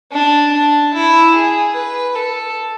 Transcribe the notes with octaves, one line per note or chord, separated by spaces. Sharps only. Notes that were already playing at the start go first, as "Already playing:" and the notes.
D4
D4
E4
G#4
B4
A4